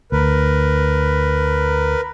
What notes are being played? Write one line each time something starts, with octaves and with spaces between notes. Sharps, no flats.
D2 A#4 B4